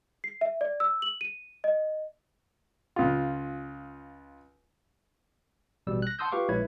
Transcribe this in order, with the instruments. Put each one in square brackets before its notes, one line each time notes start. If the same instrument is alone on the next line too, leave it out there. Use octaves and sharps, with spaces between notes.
[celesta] C7
E5
D5
E6
F#7
D#7
D#5
[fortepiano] C#2 F4
[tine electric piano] A1 B2 G3 E6
F#6 A#6
F#5 A5 C6 D#6 E6 G6
F4 G4 B4 F5 C#6 D6
A#1 G#3 E4 B4 C#5 G#6